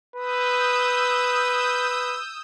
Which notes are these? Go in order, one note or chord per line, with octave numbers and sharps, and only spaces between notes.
B4 D#6 E6 G6